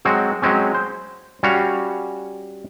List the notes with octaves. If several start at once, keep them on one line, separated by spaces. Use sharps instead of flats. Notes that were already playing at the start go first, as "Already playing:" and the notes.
F#3 G#3 C4 F#4
F#3 G#3 C4 C#4
C5
G3 C#4 F#4 F5